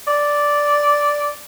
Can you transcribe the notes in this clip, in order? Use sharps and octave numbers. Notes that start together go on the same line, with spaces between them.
D5